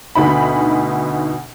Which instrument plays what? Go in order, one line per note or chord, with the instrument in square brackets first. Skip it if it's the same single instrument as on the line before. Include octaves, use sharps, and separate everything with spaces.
[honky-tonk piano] D2 B2 D#4 B5